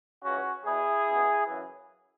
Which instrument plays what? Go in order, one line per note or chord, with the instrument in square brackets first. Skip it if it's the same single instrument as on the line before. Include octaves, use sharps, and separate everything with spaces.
[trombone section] C#2 C#3 E3 C#4 F#4
E2 B2 E4 G#4
C#2 B2
F#2 C#3 E3